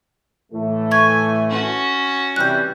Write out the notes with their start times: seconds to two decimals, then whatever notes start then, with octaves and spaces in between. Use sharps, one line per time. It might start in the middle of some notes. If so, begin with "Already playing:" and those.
0.52 A2 E3 A3
0.91 G#5 C#6 G#6
1.50 C#4 F#4
2.36 C3 E3 G3 F#6 G6